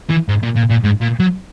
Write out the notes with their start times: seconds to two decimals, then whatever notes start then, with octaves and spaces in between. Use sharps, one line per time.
0.10 E3
0.29 G#2
0.43 A#2
0.55 A#2
0.70 A#2
0.84 G#2
1.01 A#2
1.20 F#3